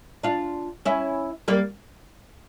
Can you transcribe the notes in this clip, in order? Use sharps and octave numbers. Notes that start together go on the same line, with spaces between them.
D4 F4
C#4 E4
G3 A#3